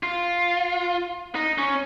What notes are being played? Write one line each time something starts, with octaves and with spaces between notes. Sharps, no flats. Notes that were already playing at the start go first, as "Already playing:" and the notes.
F4
D#4
C#4